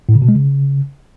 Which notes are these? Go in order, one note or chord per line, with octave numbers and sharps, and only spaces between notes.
A2
C#3
B2
G#3
C#3